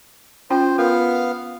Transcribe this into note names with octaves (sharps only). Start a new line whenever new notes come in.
C#4 F4 C5 G5
B3 F4 A#4 F5